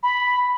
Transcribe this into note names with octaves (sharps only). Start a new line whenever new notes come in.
B5